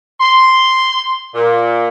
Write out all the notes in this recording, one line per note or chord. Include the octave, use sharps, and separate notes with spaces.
C6
A#2